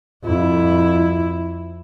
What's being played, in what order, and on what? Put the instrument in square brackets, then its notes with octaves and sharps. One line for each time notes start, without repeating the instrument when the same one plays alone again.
[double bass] F2 E4